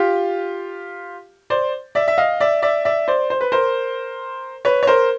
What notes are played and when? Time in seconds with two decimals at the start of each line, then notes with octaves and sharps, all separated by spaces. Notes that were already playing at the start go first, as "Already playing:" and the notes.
Already playing: F4 G4
1.50 C5 D5
1.95 D5 E5
2.08 E5
2.18 D#5 F5
2.40 D5 E5
2.62 D5 E5
2.85 D5 E5
3.08 C5 D5
3.30 C5
3.41 B4
3.52 A#4 C5
4.65 B4 C#5
4.83 C#5
4.87 A#4 C5